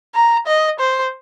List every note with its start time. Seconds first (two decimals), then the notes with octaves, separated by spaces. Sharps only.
0.15 A#5
0.47 D#5
0.80 C5